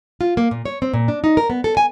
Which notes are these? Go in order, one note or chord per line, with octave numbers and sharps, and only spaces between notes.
F4
A#3
A#2
C#5
C4
A#2
D4
D#4
A#4
B3
A4
G#5